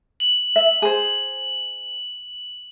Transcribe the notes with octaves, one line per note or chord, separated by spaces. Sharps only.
F#7
E5
G#4 C5